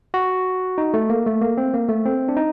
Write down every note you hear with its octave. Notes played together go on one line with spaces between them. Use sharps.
F#4
D#4
A3
A#3
A3
A#3
C4
A#3
A3
C4
D4
D#4